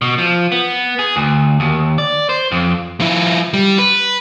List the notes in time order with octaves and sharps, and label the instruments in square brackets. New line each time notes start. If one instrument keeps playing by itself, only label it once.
[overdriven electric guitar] B2
F3
B3
G#4
D2
D#2
D5
C5
F2
[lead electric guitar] F3 E4
G3
B4